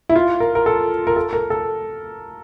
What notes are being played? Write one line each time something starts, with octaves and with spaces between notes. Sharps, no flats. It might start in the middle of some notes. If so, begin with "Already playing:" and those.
E4
F4
A#4
A#4
A4
A#4
A4
A#4
A4